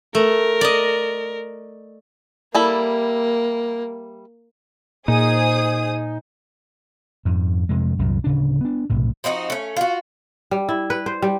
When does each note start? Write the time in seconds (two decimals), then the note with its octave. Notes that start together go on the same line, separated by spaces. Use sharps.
0.15 A3 A#4
0.61 D5 D#5
2.55 G3 A#3 E4 A4
5.08 A#2 D#4 G#4 C5 D#6
7.25 F2 G#2
7.69 F2 C3 G#3
7.99 C2 F#2 A#2 F#3
8.24 D1 C#3 D4
8.61 B3 D4
8.90 B1 A2 C3
9.24 F3 C4 D#4 F#4
9.50 A3 C#4
9.77 F4 F#4
10.51 G3
10.69 E4
10.90 B4
11.06 C5
11.22 G3